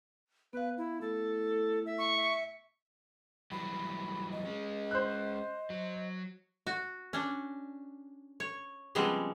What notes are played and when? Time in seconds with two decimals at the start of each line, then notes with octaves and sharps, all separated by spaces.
0.53 B3 B4 F5
0.78 E4
1.01 A2 A4
1.86 E5
1.98 C#6
2.17 E5
3.51 E3 F#3 G3 B5
4.31 D#5
4.46 G#3 C#4
4.91 C5 F#6
5.70 F#3
6.67 F#4
7.13 C#4 D4
8.40 C#5
8.95 C#3 F3 G3 G#3 B3 C4